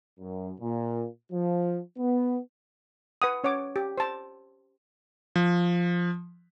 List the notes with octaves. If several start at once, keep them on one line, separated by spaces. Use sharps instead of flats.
F#2
A#2
F3
B3
B4 F#5 D#6
C#4 C#5 F#5 D6
G4
C5 A5
F3